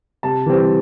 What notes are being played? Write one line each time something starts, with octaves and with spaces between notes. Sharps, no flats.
C3 A5
E3 G3 C4